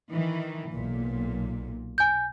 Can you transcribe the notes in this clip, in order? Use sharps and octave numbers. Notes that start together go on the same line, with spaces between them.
D#3 E3
B1 A#2
G#5 G6